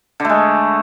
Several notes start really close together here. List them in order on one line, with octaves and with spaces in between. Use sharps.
D3 A3 G#3